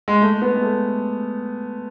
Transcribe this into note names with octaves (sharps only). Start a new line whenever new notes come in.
G#3
A3
B3
G#3
A3